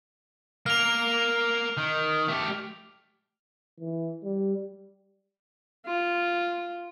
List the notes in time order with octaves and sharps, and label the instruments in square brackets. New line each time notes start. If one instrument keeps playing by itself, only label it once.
[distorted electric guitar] A#3 A#4 [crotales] F6 F7
[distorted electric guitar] D#3
A3 G4
[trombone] E3
G3
[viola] F4